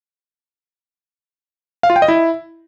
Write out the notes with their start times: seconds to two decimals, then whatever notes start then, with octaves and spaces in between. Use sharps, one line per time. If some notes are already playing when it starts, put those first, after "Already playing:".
1.83 F5
1.90 F4
1.96 G5
2.02 D#5
2.08 E4